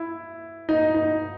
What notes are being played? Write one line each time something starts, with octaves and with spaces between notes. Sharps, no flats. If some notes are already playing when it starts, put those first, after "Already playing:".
Already playing: E4
D#4
D#4